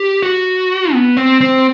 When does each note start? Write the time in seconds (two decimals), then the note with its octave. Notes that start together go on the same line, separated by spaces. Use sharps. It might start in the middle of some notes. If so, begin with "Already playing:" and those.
Already playing: G4
0.22 F#4
0.93 B3
1.17 C4
1.41 C4